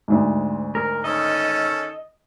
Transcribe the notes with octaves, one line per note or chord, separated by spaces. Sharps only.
D2 G#2
A#4
D#3 C#4 A4 D#5